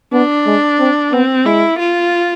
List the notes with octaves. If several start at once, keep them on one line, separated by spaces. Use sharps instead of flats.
B3 D4
G#3
C4
B3 C4
G#3 E4
F4